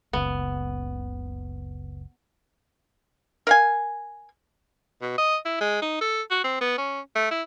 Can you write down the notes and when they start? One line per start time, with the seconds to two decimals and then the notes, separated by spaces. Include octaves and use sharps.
0.13 F#1 C#2 B3
3.47 A#4 F5 G#5
5.02 B2
5.18 D#5
5.45 E4
5.61 G#3
5.82 D#4
6.01 A4
6.31 F#4
6.44 C4
6.61 B3
6.78 C#4
7.16 A3
7.31 E4